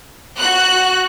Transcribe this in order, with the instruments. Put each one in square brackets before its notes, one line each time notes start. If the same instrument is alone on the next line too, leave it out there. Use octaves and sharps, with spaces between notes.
[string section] F#4 F#6